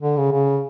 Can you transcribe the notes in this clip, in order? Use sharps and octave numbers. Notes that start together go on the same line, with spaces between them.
D3
C#3
C#3